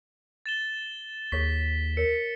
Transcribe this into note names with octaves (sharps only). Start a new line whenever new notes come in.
A6 E7 G7
D#2 G#4 C#5 C#6 B6
A#4 C#5 C#7